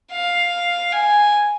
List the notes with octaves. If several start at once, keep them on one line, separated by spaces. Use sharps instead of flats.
F5
G#5